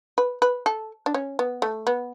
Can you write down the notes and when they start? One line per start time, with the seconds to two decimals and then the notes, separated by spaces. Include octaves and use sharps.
0.18 B4
0.42 B4
0.66 A4
1.06 D4
1.14 C#4
1.39 B3
1.62 A3
1.87 B3